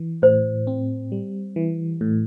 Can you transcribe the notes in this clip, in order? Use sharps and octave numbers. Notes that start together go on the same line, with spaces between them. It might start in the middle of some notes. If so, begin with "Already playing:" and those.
Already playing: E3
A2 C5
C4
G3
E3
A2